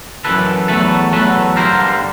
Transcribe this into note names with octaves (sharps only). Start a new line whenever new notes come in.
F#2 C#3 E3 A4 B4
E2 B2 F#3 A3 A4 B4
E2 B2 F#3 A3 A4 B4
G2 D3 G3 A#4 C5